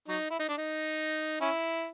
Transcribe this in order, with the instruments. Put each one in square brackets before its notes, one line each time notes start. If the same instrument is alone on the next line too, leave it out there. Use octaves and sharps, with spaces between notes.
[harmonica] F#3 D#4
E4
D#4
D4
D#4
C#4 E4